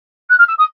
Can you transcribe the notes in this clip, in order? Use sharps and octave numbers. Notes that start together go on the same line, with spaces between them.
F#6
F6
E6
D#6